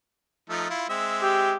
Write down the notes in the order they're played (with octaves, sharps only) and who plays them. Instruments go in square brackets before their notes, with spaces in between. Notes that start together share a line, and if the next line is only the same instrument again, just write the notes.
[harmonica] F3 A3 D#4
E4 F4
G#3 C4 E5
[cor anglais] G4